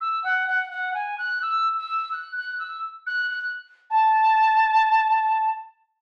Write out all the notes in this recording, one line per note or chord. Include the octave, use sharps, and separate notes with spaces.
E6
F#5
F#5
F#5
G#5
F#6
E6
E6
F#6
F#6
E6
F#6
F#6
A5